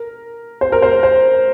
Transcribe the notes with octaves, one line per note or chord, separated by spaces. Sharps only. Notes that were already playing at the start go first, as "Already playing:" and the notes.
Already playing: A#4
C5
A#4
C5
C5